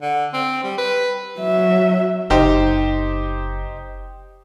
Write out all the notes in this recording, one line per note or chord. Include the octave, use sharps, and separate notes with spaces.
D3
C4
G3
B4
F#3 E5
F#1 D#4 G4 C5